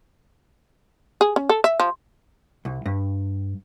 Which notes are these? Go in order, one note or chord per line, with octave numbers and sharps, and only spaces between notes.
G#4
C#4
A4
E5
F3
C2
G2